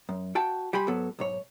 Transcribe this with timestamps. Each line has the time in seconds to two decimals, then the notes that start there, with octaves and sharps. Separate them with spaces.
0.09 F#2
0.35 F#4 G5 A5
0.73 G3 G4 G#5 B5 C6
0.88 G#2 F#3 B3 A4
1.19 B1 G#2 C#5